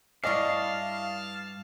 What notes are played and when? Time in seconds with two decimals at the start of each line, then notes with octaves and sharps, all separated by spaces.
0.24 G2 E4 D5 D#5 F5 A5 C#6 F6